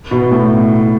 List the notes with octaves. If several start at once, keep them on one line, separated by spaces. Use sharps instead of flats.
B2
A2